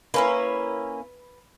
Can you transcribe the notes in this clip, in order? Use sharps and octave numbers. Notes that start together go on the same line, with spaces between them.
A#3 C#4 E4 B4